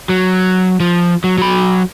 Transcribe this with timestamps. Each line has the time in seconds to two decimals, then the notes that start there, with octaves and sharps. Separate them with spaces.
0.09 F#3
0.80 F3
1.24 F#3
1.38 F#3 B5